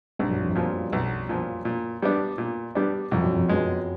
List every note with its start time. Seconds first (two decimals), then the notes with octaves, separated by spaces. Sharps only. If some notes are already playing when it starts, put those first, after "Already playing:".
0.19 B1 G2
0.29 F#2
0.40 F2
0.50 F#2
0.55 A#2 F3
0.92 B1
1.29 A#2 F3
1.65 A#2
2.02 G3 B3 D4
2.38 A#2
2.75 G3 B3 D4
3.11 C2 F2
3.23 F#2
3.33 F2
3.48 F#2 B2 G#3